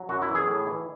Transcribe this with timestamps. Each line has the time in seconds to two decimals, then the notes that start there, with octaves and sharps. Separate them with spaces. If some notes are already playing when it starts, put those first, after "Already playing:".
Already playing: F#3
0.09 F#2 F#4
0.22 E4
0.29 E3
0.35 G#4
0.48 A2
0.67 E3